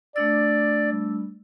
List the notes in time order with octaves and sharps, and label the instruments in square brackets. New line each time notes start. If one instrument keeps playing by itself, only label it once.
[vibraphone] A3 D4 E6 [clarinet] D5
[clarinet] G3